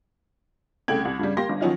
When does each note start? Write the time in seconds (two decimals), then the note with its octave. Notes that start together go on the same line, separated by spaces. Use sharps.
0.88 C2 C#3 A3 G5 G#6 F#7
1.05 C2
1.19 G2 C#3 G3
1.37 A#3 G4 C6 A#6
1.49 G1 G2
1.61 D#3 F3 F#3 C#4 D#4 F4